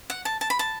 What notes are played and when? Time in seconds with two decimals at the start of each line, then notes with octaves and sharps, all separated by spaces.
0.10 F#5
0.25 A5
0.41 A5
0.50 B5
0.59 A5